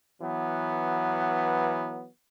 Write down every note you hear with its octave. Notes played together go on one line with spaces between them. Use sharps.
E3 F#3 B3